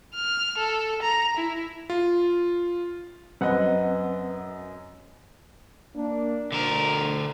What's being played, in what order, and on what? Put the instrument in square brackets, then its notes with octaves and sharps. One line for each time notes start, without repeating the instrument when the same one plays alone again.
[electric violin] F6
A4
A#5
E4
[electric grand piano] F4
[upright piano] F#2 D#5 [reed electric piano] C4 B4 F#5
[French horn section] A#3 D4
[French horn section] D2 [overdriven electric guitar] D3 A#4